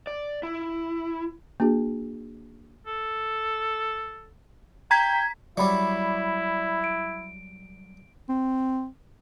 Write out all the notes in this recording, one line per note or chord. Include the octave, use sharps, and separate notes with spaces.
D5
E4
A#3 D4 F#4 G#4
A4
G5 A#5 G#6 B6
F#3 G3 E4 D5 B5
D7
C4